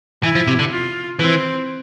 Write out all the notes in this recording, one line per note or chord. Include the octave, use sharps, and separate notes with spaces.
E3 E4
F3
C3
D3
F4
E3 C4